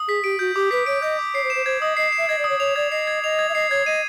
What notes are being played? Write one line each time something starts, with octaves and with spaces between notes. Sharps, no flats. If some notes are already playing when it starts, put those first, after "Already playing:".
Already playing: D#6
G#4 B6
G4 D7
F#4 G6
G4 D6
B4 B6
C#5 D7
D#5 G6
D6
C#5 C7
C5
E7
C5
C5 G#6
D#5 D#6
D#5 C7
E7
E5
D#5 G#6
D5
D#6
C#5
C#5 F7
D5 G#6
D#5 C7
G#6
D#5 F7
G#6
E5
D#5 C7
C#5 G#6
D#5 D#7